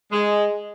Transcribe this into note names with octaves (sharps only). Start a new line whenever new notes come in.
G#3